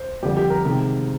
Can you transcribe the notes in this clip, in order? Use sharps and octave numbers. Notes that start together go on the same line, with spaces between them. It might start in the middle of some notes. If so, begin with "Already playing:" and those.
Already playing: C5
F2 D3 G3 G4
G4
A#4
C3 D#3 G#3